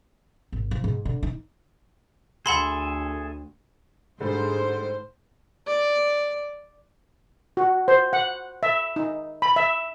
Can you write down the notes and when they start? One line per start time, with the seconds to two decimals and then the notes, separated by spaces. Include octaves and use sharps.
0.52 G#1
0.71 F3
0.84 G#2
1.05 D3
1.23 D#4
2.46 D2 G#4 A4 E5 F#5 B5 C6
4.20 G#2 D3 G3 A3 G#4 C5
5.67 D5
7.57 F#4
7.88 C5
8.13 F#5
8.63 E5
8.96 D#4
9.42 B5
9.56 E5